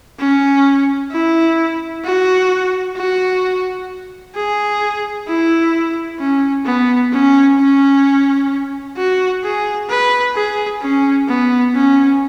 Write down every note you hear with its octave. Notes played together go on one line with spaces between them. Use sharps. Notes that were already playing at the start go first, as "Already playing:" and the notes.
C#4
E4
F#4
F#4
G#4
E4
C#4
B3
C#4
C#4
F#4
G#4
B4
G#4
C#4
B3
C#4